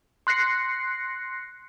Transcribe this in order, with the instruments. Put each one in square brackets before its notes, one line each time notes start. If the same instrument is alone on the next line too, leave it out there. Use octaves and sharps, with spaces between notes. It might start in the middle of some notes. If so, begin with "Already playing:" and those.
[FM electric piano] C6 F#6 A#6 C7 C#7